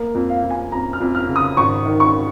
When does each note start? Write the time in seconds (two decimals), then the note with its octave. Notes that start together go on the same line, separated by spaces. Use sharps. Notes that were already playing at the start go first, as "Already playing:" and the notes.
Already playing: A#3
0.15 F2
0.29 F5
0.44 F2
0.50 G#5
0.72 F2 A#5
0.93 F6
1.00 F2
1.15 F6
1.28 C#3
1.36 D#6
1.57 G#1 C#6
1.86 D#3
2.00 C#6